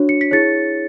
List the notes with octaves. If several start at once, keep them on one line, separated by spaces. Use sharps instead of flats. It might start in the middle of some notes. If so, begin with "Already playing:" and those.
Already playing: D4 F#4 C#5
C#7
B6
E4 G#4 C#5 A6 C#7